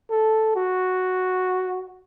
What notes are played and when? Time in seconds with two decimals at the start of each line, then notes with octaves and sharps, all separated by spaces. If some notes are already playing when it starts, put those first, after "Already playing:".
0.11 A4
0.55 F#4